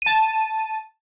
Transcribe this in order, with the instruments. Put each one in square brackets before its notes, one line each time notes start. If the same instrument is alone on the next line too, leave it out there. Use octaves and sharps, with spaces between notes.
[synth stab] A5 D#7